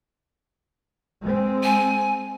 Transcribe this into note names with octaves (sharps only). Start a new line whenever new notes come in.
G#3 C4
G#5